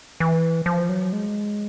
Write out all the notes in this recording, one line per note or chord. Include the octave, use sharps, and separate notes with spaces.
E3
F3
F#3
G#3